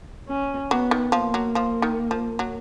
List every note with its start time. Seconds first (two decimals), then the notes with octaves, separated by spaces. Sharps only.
0.28 C#4
0.71 F#3 B3
0.91 D#3
1.12 F3 A#3
1.34 F#3
1.55 F3
1.82 D#3
2.11 F3
2.39 F#3